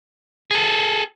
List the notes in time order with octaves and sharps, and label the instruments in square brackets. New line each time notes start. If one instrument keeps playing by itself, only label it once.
[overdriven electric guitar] G#4 A4